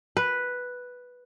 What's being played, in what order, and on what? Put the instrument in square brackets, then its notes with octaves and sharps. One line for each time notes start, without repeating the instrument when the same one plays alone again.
[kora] B4